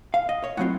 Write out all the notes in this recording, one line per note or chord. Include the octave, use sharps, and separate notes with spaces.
F5
D#5
C#5
A2 F#3 C4 F4 F#5